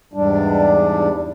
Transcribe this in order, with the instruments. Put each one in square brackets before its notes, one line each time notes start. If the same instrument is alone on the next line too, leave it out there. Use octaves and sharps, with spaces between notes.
[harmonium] E2 G#2 G3 D4